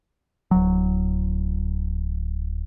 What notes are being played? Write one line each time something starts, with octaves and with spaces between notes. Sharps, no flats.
D1 F#3